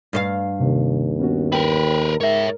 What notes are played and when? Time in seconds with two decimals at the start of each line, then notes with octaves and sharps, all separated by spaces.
0.13 G2 C5 F5
0.60 D#2 C3
1.19 B3 C#4 F#4
1.52 A#4 B4 G5
2.21 G#2 A#4 C#5 E5